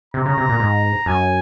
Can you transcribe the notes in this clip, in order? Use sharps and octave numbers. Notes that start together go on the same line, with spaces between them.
C3 A#5
C#3
C3
A#2
G#2
F#2 G#5